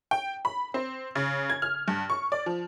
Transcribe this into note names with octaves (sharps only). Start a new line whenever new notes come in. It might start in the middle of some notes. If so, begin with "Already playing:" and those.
G5
B5
C4
C#3
G#6
F6
G2
C#6
D5
F3